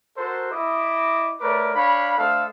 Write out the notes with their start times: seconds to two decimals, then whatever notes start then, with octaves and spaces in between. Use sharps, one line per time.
0.17 F#4 A4 A#4 C5
0.52 E4 D#5 D6
1.41 A3 A#4 B4 C#5 D5 D6
1.75 D4 C#5 F5 B5
2.18 A3 D4 A4 C5 D#5 F5